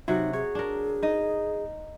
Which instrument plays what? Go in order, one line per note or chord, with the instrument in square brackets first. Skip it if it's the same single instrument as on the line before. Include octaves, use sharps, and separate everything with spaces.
[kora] C3 F#3 F#4 [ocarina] D#4
[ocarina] G#4 [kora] C#5
[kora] D4 A#4
D#4 D#5